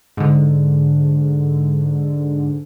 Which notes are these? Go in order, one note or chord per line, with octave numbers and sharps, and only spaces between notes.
G#2 D3